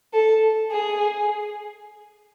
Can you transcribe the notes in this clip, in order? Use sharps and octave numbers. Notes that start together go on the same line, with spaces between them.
A4
G#4